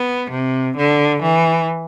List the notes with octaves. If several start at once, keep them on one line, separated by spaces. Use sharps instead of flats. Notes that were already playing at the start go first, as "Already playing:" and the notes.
Already playing: B3
C3
D3
E3